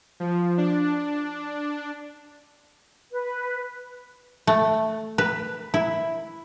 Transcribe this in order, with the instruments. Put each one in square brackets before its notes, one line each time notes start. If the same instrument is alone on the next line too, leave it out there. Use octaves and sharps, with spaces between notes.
[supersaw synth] F3
D4
[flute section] B4
[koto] A3
B4
E4